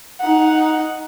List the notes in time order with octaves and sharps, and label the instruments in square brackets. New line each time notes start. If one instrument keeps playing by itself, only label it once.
[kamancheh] D#4 F#5